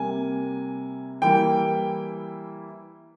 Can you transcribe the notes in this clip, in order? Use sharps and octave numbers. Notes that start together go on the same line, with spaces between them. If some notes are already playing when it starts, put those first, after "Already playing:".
Already playing: C3 G3 A#3 G#5
E3 G3 A#3 E4 G5